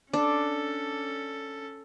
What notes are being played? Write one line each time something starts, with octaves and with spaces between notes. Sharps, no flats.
C#4 D4 A4